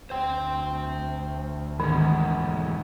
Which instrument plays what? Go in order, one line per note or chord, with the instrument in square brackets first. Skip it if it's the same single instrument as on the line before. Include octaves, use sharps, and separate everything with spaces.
[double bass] D2 [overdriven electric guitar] C5 G5
[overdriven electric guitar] E2 G#2 [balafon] D#3